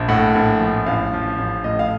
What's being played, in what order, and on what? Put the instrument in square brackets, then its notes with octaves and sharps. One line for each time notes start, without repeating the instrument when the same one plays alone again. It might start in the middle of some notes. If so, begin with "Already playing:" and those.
Already playing: [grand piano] A#1
A2 F#5
A#1
F3
A1 F5
F3
A1
A2 D#5
F5